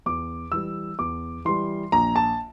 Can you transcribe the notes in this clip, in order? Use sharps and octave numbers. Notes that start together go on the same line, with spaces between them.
E2 D6
E3 G3 E6
E2 D6
E3 G3 C6
A#1 A#5
A5